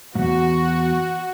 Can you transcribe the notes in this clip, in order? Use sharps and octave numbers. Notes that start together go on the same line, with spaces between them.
E2 G#2 F#4